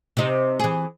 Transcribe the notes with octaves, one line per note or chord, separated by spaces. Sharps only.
C3 D#4
E3 G#4